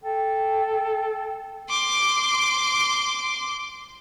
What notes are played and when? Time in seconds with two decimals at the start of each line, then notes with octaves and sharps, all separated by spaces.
0.04 A4 G5
1.70 C6 D6